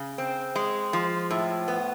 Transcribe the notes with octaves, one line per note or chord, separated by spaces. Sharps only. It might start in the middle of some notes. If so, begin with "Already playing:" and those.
Already playing: C#3
C4
G#3
F3
A2
B3